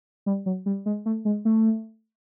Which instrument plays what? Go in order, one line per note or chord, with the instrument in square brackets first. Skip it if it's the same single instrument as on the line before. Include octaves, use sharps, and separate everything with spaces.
[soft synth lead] G3
F#3
G3
G#3
A3
G#3
A3